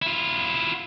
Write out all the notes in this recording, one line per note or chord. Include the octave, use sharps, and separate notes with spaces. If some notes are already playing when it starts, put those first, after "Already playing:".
E4 F4